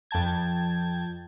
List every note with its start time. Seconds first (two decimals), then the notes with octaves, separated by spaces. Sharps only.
0.11 F2 G5 A5 G#6